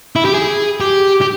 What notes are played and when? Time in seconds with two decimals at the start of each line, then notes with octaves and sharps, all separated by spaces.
0.16 E4
0.25 G4
0.34 G#4
0.81 G4
1.21 G4